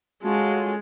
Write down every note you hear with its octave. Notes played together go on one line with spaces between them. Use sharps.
G#3 C#4 F4 F#4 A4